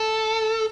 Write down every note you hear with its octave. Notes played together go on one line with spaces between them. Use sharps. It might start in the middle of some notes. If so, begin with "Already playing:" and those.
Already playing: A4